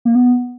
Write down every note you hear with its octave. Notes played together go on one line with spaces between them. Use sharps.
A#3
B3